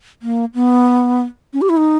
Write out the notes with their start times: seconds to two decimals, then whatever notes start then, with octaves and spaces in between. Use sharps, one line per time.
0.22 A#3
0.54 B3
1.53 C#4
1.62 G4
1.69 E4
1.77 D#4